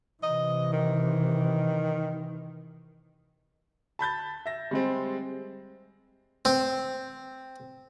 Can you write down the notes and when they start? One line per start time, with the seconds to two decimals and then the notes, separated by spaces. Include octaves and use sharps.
0.23 C3 E3 D#5
0.72 D#3
3.99 A5 B5 G6 A6
4.46 E5 A#6
4.71 G3 G#3 C4
6.45 C4